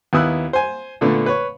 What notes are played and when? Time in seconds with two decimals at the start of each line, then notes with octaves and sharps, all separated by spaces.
0.13 D#2 B3 E4 D#6 E6 F#6
0.53 C5 G#5
1.01 A#2 D3 A3 B3
1.26 B4 C#5